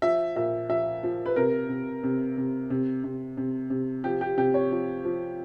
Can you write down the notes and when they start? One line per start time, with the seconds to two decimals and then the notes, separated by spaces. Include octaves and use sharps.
0.02 F3 E5
0.36 A#2 E5
0.69 F3 E5
1.03 F3
1.26 B4
1.36 C3 A#4
1.69 C3
2.03 C3
2.37 C3
2.70 C3
3.04 C3
3.37 C3
3.70 C3
4.04 F3 G4
4.21 G4
4.37 C3 G4
4.54 C#5
4.72 F3
5.05 F3